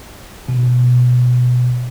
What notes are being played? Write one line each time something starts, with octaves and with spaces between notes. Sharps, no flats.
B2